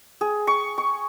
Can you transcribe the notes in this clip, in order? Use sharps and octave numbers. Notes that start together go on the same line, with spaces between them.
G#4
C#6
C#6